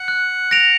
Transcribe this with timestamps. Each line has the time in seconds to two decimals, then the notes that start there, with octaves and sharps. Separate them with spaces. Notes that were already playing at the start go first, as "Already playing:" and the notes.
Already playing: F#5
0.08 F#6
0.51 A#6 D7 F7